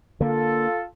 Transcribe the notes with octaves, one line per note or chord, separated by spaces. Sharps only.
D3 A#3 F4 A4